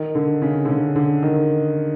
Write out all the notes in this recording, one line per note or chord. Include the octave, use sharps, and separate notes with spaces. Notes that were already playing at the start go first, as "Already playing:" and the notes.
Already playing: D#3
D3
C#3
D3
C#3
D3
D#3